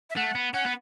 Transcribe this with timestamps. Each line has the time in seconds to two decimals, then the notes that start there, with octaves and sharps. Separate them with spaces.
0.10 E5
0.16 A3 F#5
0.35 B3
0.54 C#4 F#5
0.66 B3